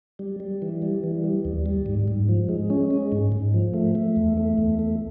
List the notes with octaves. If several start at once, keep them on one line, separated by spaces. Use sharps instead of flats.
G3
G3
E3
G3
E3
G3
D#2
G3
G#2
G#2
F3
G#3
C#4
G#3
G#2
G#2
F3
A3
A3
E2
A3
E2
A3